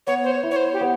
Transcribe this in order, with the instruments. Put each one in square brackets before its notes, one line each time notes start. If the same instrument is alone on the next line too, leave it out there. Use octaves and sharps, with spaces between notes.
[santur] B3 [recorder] C#5
[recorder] C5
C#5
[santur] E4
[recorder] C#5
C5
G4
[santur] B3